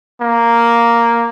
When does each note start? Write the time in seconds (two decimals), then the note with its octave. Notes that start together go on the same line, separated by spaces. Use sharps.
0.21 A#3